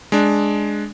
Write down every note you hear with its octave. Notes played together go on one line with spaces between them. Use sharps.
G#3 D4